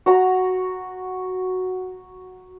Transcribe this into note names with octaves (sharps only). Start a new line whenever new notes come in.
F#4 A#5